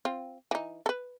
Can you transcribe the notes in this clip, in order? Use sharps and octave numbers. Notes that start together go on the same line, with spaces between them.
C4 F4
E3 D#4
A4 B4